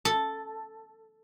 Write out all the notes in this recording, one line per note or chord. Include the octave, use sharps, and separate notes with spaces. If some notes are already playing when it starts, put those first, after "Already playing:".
A4